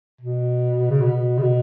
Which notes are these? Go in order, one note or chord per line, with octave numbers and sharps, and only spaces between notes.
B2
C#3
B2
C#3
B2